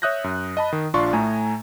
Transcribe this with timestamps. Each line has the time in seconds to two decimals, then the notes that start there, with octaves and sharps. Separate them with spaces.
0.02 C#5 E5 D#6 F#6 G6 A#6
0.24 F#2
0.57 D#5 A5 B5
0.73 D#3
0.94 A#1 D4 F4 D5 C6 C#6
1.13 A2 A3 G#5 A#5